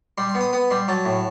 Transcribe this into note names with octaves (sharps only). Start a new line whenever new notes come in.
G3 C6
C6
B3
D#6
B3 D#6
G3 C6
F#3 A5
A2